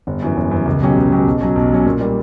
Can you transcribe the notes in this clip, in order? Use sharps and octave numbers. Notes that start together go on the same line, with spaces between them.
G1
F#2 E3
G1
F#2 E3
C#2
B2 F#3 C#4 G4
C#2
B2 F#3 C#4 G4
B1
B2 F#3 C#4
B1
B2 F#3 C#4
A#2
G3 A#3